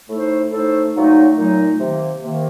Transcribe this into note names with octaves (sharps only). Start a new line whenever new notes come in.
A2 A3 D#4 A4 C5
A2 A3 D#4 A4 C5
A#2 F#3 A3 D#4
A#2 F#3 A3 D#4
C3 D#3 A#3
C3 D#3 A#3